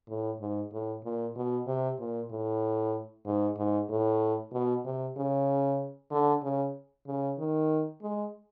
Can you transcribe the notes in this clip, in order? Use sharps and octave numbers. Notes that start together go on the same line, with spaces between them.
A2
G#2
A2
A#2
B2
C3
A#2
A2
G#2
G#2
A2
B2
C3
C#3
D3
C#3
C#3
D#3
G#3